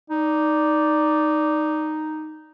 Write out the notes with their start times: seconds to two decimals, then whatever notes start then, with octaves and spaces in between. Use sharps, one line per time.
0.10 D#4 D5